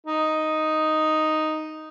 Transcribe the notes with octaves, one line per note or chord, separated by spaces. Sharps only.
D#4